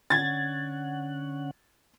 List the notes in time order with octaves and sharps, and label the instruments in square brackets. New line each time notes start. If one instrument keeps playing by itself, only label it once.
[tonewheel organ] D3 C#4 F#5 [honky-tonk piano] G#6 A6